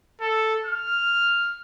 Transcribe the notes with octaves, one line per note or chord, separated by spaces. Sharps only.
A4
F6